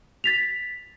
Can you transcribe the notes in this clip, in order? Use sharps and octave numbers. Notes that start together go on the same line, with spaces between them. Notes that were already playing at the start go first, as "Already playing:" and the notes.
A6 B6 F7